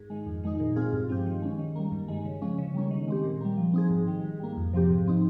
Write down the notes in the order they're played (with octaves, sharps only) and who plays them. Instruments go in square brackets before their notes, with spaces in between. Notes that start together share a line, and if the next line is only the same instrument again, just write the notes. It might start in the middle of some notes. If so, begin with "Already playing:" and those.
Already playing: [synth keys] G#2
D#3 G#3
F2
D#3 G#3 D#4
A#2
G#3 C4 F4 G#4
G2
F3 C4 G4
D#3
G#3 C#4
D#3
G3 A#3
G2
D#3 G#3
C#3
F3 G#3 C#4
C#3
G3 A#3 C#4
D#3
G#3 C4 G4
A#2
G3 A#3
F3
C4 D#4 G#4
G#2
D#3 G3
G#2
G3 A#3
F2
C3 F3 C4 G4
G#2
F3 C4 D#4